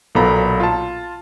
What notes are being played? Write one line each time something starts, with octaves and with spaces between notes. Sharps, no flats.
B1 A#2 B3 A4 A#5 B5
F4 A5